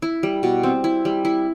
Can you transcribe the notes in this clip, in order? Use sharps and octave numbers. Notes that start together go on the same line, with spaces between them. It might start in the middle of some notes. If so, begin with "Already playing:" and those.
E4
G3
B2
C4
E4
G3
E4